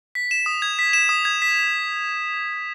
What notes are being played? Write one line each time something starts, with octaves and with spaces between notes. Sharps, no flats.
B6
E7
D#6
G#6
B6
E7
D#6
G#6
B6